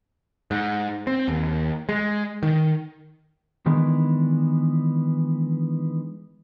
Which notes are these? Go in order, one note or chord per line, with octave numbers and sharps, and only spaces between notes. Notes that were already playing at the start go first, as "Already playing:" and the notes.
G#2
C4
D#2
G#3
D#3
D#3 E3 G#3 B3 D4